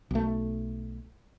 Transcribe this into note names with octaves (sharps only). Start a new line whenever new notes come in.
B1 A3